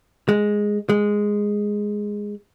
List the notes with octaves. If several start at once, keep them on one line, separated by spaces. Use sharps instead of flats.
G#3
G#3